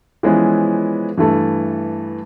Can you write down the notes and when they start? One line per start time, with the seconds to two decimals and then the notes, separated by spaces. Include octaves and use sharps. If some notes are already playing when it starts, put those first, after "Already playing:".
0.23 E3 F3 G#3 B3 C#4 E4
1.18 G2 E3 A3 A5